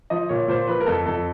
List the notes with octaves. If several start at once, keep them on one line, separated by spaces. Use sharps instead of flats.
F3 D#5
A#2 C#5
A#2 C5
F3 B4
A#4
F2 A4
F2 A4